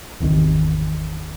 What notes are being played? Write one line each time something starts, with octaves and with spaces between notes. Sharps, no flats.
G#1 E2 C3 D#3